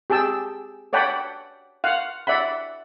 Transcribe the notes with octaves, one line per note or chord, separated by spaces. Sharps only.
G4 G#4 G5 A5 E6
C#5 D5 F#5 G5 A5 B5
F5 F#5
D5 E5 F#5 B5